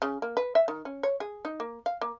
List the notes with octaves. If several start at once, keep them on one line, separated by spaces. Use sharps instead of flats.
C#3
A#3
B4
E5
D#3
C#4
C#5
G#4
D#4
A#3
F5
A#3